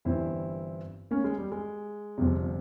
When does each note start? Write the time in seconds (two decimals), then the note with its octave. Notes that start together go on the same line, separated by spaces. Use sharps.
0.05 G1 G2 E3 C4 E4
1.11 A#3 C#4
1.24 G#3
1.38 G3
1.52 G#3
2.18 G1 F2 C3